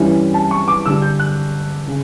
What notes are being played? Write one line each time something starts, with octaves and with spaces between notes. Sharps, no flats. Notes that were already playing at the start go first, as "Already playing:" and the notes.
Already playing: G2 E3 G3 C#4 E4
A5
C#6
D6
G2 D3 G3 D4 E6
G6
F#6
C#3